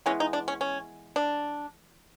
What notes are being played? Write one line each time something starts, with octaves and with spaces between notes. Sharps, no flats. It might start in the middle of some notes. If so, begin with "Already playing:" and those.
E3 G#3 B3 C#4
D#4
D4
C#4
C#4
D4